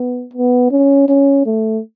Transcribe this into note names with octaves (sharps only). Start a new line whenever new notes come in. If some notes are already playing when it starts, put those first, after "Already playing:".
Already playing: B3
B3
C#4
C#4
A3